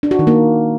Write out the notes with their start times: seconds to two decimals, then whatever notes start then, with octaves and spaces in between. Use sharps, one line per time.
0.03 D4
0.11 F#4
0.19 D#3
0.27 A#3